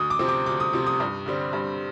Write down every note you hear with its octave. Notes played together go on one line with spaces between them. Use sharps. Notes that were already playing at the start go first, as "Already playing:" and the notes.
Already playing: D2 D#6
D6
C3 F3 C4
D6
D2 D6
D#6
C3 F3 C4
D#6
G2
D3 G3 C4
G2